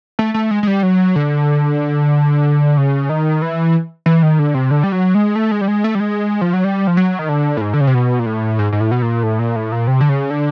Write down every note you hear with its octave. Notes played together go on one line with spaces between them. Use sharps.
A3
A3
G#3
G#3
G3
F#3
D3
C#3
D#3
E3
E3
D#3
D3
C3
D3
G3
F#3
G#3
A3
G#3
G3
G#3
A3
G3
G#3
F3
F#3
G3
F3
F#3
D#3
D3
A2
G#2
D3
C#3
C3
B2
A#2
A2
G#2
G#2
A2
B2
A#2
A2
A#2
A2
A#2
C3
D3
C#3
D3